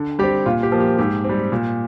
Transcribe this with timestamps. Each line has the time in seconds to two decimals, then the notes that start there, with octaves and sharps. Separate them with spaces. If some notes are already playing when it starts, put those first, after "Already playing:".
Already playing: D3
0.19 G3 G4
0.23 C4
0.46 A#2 F4
0.63 G4
0.72 F3 A#3
0.80 G4
0.98 G#2 G4
1.24 C4
1.29 G3
1.52 A#2